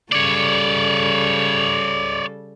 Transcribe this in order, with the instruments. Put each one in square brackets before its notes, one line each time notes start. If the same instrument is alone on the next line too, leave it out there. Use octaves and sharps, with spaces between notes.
[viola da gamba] C#3 G3 A4 [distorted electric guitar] C#5 D5